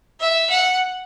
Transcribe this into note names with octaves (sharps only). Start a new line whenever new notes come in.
E5
F#5